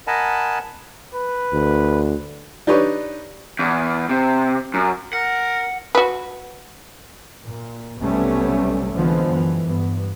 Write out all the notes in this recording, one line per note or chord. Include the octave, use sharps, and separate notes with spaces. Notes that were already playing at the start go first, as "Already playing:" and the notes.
A#4 D#5 F#5 G#5 A5 B5
B4
D2
D4 D#4 G4 B4 C#5
E2
C3
F#2
A#4 F#5
F#4 B4
A#2
B1 C3 G3 A3 B3 C#4
C2 D3 E3 F3 G#3 B3
F#2 E3
G2 B3